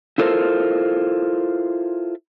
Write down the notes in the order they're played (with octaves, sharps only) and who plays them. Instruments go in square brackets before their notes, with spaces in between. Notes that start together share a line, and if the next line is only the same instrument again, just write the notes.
[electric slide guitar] E4 F4 A4 A#4 C5